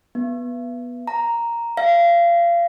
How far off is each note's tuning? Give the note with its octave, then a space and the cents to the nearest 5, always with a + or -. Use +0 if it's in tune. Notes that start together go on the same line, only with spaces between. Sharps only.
B3 -10
A#5 +0
F5 -30